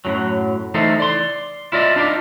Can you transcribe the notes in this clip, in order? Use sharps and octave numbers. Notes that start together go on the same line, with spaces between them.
F#2 A2 F#3
E3 A3 D#4 A4 C5
D5 C6
E4 F4 D5 D#5
D4 D#4 F4 D5